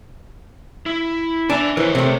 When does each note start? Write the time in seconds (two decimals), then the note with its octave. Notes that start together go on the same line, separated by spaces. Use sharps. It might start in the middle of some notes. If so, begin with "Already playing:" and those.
0.86 E4
1.50 D4 E5 G#5
1.77 E3 A#4 C5 C#5
1.95 C3 A3